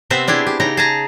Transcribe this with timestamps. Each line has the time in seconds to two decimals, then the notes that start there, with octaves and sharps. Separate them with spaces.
0.10 C3 B3 C4 C5 E5
0.28 D4 E4 G4 G#4
0.47 G4
0.60 C#3 D#4 G4 A#5
0.77 G#4 A5 A#5